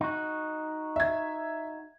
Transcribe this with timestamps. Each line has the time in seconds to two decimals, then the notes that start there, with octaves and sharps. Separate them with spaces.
0.01 D#4 F#4
0.96 E5 G#6